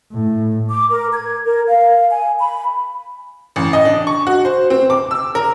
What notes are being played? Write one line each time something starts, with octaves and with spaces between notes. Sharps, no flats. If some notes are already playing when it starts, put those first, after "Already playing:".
A2
D6
A#4
G#6
A#4
F5
G#5
B5
A1
D#5
D4
C#6
F#4
C5
C4
D6
E6
A#4